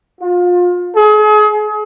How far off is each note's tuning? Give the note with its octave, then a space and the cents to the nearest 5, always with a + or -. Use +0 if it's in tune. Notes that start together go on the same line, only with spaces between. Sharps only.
F4 +25
G#4 +35